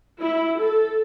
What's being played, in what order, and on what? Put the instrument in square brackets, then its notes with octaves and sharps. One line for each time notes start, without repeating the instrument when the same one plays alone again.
[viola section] E4
A4